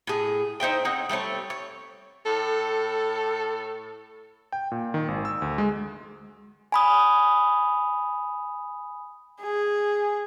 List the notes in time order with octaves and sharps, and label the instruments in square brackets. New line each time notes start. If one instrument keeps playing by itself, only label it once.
[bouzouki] A2 G#4
D#4 C5 E5 G5
C4 D#4 C#5 F#5
G3 A3 C4 C#5
C#5
[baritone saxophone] A2 [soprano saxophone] A4
[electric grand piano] G5
A#2
D#3
G#1
E6
D2
G#3
[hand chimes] G#5 B5 D#6
[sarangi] G#4